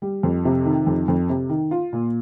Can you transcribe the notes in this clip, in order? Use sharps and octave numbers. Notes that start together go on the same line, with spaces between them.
G3
F2
C3
D#3
F2
F2
C3
D#3
F4
A#2